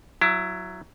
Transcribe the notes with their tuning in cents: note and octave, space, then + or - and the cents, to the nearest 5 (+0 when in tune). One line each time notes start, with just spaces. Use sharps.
F#3 +0 E4 +25